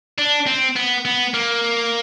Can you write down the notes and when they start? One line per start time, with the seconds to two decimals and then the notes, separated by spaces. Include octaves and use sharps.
0.18 D4
0.47 C4
0.76 B3
1.05 B3
1.34 A#3